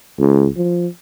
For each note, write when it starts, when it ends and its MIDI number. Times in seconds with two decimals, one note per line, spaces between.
0.19 0.48 37
0.57 0.87 53